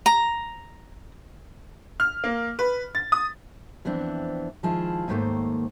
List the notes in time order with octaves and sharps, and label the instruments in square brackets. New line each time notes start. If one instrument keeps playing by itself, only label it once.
[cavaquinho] A#5
[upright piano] F6
A#3
B4
A6
D#6
[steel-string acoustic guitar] F2 E3 B3 C4 D4
D#3 F3 G#3 E4 F4 A5
D#2 G#2 D#3 A3 A#3 C5